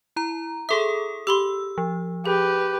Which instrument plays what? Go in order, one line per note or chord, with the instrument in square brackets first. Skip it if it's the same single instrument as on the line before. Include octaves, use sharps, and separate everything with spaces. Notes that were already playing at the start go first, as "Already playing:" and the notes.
[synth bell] E4 A#5
[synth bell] G#4 A4 D#6 [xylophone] E5 C6
[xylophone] G4 B5 C6 [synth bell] E6
[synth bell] F3
[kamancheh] G4 B4 [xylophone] G#4